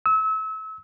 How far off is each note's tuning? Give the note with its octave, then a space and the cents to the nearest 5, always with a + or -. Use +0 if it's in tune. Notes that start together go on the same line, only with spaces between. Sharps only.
E6 -30